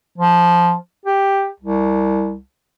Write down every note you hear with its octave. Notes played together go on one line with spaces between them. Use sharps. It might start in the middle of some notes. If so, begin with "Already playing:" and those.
F3
G4
C2